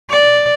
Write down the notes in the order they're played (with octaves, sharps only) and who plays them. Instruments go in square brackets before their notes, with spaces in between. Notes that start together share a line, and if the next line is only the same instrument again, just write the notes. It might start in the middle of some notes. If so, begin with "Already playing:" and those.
[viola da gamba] D5